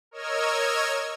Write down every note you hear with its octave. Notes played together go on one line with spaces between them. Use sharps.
A#4 C#5 D#5 E6 F6 G#6